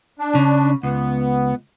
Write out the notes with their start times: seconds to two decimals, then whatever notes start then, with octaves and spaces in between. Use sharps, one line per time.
0.19 D4
0.35 C#3
0.83 C#2 B3